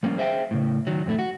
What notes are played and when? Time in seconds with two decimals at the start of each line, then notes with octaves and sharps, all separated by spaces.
0.03 F3 G3 A#3 C#4
0.17 G#4 C5 E5 F5 G5
0.51 A2 C#3
0.87 D#3 F#3
1.06 F2 A2 A3 E4
1.19 F#4